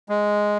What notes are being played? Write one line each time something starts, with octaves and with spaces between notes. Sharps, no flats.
G#3